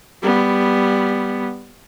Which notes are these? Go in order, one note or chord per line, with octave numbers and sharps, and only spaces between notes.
G3 B3